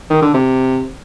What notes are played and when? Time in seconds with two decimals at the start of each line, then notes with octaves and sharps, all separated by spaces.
0.10 D#3
0.22 D3
0.34 C3